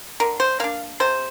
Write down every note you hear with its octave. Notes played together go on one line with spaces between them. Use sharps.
D3 A#4
C5
A#3 D4 F5
C3 C5